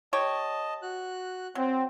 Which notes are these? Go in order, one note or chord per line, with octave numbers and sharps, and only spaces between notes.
G4 C#5 D#5 A5
F#4 F#6
F#3 C4